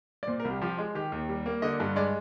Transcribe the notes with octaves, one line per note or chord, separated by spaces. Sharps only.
D5
A#2 C5
A#4
C2
G4
F3 G4
G#3
D#3 G4
D#2
G3
A#3
D3 D#5
G2
G#3 D5